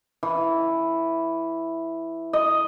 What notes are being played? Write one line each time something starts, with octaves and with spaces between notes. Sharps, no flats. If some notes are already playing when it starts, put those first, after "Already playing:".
E3
D#5